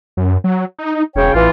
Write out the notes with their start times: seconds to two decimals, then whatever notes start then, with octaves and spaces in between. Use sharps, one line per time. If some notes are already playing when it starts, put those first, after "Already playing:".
0.17 F#2
0.44 F#3
0.79 D#4
1.15 E1 C#3 C#5 G5
1.34 A1 E3 F4